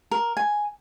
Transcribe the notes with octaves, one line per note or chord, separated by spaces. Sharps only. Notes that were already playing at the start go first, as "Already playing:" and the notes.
A#4
G#5